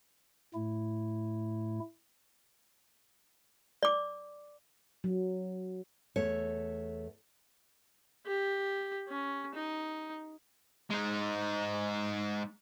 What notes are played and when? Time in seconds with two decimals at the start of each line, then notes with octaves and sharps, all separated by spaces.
0.54 A2 A3 E4
3.83 D5 D6
5.04 F#3
6.16 E2 A3 C#5
8.26 G4
9.09 C#4
9.54 D#4
10.90 G#3 D#4